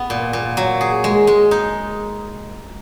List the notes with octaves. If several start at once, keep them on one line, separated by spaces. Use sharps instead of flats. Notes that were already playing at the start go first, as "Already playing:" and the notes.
Already playing: B3
A#2
A#2
F#3
G#4
G#3
G#3
D#4